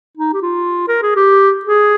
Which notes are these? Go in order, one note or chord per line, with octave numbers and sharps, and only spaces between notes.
D#4
G4
F4
A#4
G#4
G4
G#4